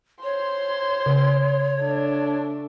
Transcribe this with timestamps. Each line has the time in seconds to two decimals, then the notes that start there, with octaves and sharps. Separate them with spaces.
0.23 C5 C#5 C6
1.06 C#3
1.80 A3 D4